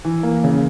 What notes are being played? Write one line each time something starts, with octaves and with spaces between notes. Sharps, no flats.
E3
A#3
C#3